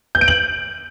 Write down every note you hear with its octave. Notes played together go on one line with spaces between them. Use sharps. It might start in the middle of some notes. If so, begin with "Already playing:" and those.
G6
D7
F#7